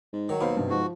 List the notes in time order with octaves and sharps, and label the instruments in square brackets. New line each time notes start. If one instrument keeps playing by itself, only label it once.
[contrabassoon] G#2
[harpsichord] D#3 [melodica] F#3
[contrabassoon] D#2 [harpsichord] B2 [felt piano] C5 F5 B5
[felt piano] G2 C3
[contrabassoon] G#2 [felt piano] F3 [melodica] F#4